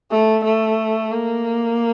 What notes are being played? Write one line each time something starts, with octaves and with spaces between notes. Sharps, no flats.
A3
A3
A#3